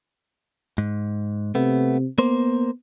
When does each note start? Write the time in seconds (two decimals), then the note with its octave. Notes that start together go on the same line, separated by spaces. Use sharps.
0.78 G#2
1.55 C3 A3 B3
2.19 A#3 B3 C5